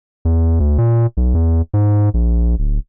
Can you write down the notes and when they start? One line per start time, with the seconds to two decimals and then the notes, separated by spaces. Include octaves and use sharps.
0.25 E2
0.60 D2
0.78 A#2
1.17 B1
1.35 E2
1.74 G#2
2.14 A#1
2.59 D1